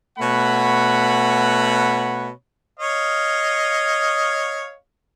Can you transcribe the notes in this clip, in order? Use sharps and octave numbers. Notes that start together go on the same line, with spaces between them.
B2 A3 C#5 F#5 B5
C#5 D#5 F5